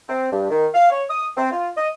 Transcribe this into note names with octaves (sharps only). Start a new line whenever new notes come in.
C4
G2
D#3
F5
C#5
D#6
C4
F4
D#5